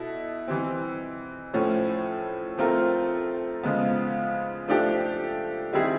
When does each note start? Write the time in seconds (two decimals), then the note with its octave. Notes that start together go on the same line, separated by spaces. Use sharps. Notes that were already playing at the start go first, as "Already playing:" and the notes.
Already playing: B2 E4 A4
0.48 E3 G3 C4
1.53 A2 F3 A3 C#4
2.57 F3 A3 C4 F4 A#4
3.63 C#3 F3 G#3 B3
4.68 F3 A3 D4 G4
5.73 D#3 G3 C4 E4 G#4